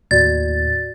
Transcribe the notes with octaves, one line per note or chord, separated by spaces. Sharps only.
D#2 A2 F#4 D5 G#6 A6